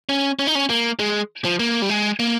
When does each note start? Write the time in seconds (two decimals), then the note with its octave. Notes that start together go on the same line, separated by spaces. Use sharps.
0.09 C#4
0.39 C#4
0.47 D#4
0.55 C#4
0.70 A#3
1.00 G#3
1.45 F3
1.59 A#3
1.82 G3
1.90 G#3
2.20 A#3